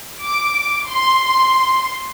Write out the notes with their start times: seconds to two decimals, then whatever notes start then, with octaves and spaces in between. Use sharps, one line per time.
0.23 D6
0.87 C6